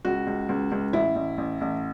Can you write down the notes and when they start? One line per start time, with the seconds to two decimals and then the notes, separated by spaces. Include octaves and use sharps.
0.05 C#2 F#4
0.27 C#2
0.49 C#2
0.72 C#2
0.93 A1 E4
1.16 A1
1.38 A1
1.61 A1